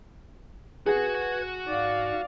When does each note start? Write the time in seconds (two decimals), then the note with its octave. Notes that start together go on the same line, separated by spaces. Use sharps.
0.86 F#4 G#4 B4 F#5 G#6
1.68 G#2 D5 F5